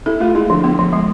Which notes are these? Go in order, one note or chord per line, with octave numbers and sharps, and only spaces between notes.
E4 A4
A3 F4
G#3 E4
D3 F3
B3
F3
G#3